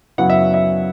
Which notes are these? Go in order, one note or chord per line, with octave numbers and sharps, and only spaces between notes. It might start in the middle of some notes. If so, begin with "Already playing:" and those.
F#2 C#3 F#3 B3 E4 F#5
E5
E5